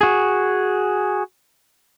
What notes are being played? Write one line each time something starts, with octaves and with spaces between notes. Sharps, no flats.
F#4 G#4